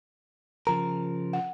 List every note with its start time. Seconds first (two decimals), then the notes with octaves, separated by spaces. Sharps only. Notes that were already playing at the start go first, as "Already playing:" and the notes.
0.67 C#3 F3 A#4 A#5
1.33 F#5